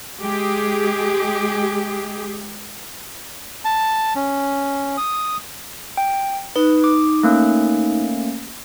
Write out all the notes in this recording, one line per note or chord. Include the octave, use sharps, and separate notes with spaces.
G#3 G4 G#4
A5
C#4
D#6
G5
D#4 B4
D6
A3 A#3 C#4